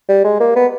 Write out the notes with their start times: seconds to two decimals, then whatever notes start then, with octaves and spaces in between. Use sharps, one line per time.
0.09 G3
0.25 G#3
0.40 A#3
0.56 B3